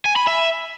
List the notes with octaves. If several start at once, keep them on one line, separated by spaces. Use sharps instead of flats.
G#5
B5
E5